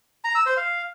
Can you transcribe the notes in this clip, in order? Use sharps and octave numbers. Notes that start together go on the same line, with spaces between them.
A#5
E6
C5
F5